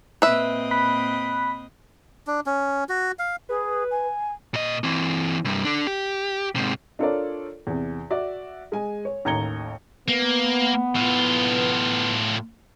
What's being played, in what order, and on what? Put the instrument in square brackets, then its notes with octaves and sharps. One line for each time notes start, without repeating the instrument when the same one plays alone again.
[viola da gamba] A#2 C4 D#5 [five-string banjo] B4 E5
[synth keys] B5 F#6 B6
[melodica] D4
C#4
F#4
F5
[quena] G#4 [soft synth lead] B4
[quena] G#5
[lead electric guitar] A#2 D#5
E3 C4
C2 G2
D3 D4
G4
G#2 C3
[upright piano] D4 F4 A4 A#4 C#5 D5
E2 C3
F#4 D5 E5
G#3 G#5
C#5
A1 D#2 A#5 G#6 C#7 G7
[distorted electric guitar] A#3 [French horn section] B3
[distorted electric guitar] A2 F4